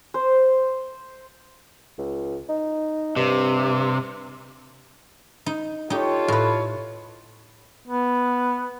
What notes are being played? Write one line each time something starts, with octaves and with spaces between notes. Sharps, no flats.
C5
C#2
D#4
G2 C3
D#4
D#4 F4 G4 A4 C#5
A2 B4
B3